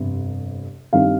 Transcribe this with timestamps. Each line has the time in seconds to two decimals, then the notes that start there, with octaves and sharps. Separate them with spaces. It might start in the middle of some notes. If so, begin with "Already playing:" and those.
Already playing: G1 F2 C3 G3
0.93 G2 D#3 G3 C4 D#4 F5